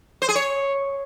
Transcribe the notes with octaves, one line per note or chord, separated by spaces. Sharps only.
C5
G#4
C#5